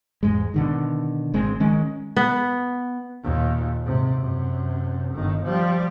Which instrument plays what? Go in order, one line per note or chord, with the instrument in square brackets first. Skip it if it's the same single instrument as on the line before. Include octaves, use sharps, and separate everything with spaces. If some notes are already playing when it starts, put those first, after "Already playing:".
[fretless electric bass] E2 G#2 G#3
B2 D3 D#3
G#1 G#3 C4
D#3 G#3 C#4
[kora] B3
[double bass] D#2 A#2
G#2 C3
F#2 C3
G1 D#3
F3 G3